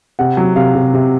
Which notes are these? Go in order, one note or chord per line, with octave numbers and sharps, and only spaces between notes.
C3 F#5
F#3
C3 F5
C3
C3